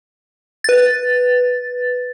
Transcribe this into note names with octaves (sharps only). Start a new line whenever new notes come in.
B4 A6